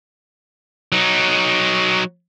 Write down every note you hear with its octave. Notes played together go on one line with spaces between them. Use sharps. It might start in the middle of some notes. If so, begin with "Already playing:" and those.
F#3 D#4